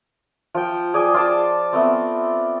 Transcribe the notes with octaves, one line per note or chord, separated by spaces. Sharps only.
F3 G5
G#4 D5 G5 G#5
F4 D5 A5
A3 B3 C4